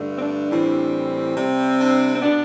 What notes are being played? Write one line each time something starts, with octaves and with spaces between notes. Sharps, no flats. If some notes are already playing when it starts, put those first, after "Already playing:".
Already playing: G2 D3 A3
C4
D4
A2 E3 G3 C4
C3 G3 C4
D4
C4
B2 B3 D4